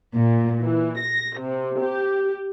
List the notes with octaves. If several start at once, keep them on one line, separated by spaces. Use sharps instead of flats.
A#2
E3
A#6
C3
G4